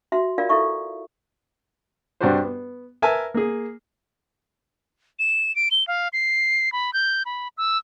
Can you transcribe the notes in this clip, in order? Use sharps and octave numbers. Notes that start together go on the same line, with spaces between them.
F#4 E5 C6
F4 A#4 D5 F5
E4 A4 E5 C#6
G2 C3 D4 F#4 G4 C5
B3
A#4 B4 E5 G#5 A5
A#3 G#4
E7
D7
G7
F5
C7
B5
G6
B5
E6